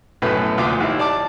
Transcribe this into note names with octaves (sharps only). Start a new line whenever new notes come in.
B1 F#2 A2 A3 B4
D2 A#2 D6
D#2 E4
D5 A5 D6